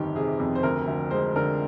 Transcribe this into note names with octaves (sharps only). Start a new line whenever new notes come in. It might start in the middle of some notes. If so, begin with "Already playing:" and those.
Already playing: G1 F2 D#3 G4
C3 G#4
F2
C5
D2 A#4
D2
G#3 C5
D3 A#4